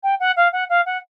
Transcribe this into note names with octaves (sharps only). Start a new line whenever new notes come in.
G5
F#5
F5
F#5
F5
F#5